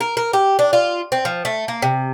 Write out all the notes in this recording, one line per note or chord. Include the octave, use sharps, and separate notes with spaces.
A#4
A#4
G4
D4
F4
C4
F3
A3
A#3
C3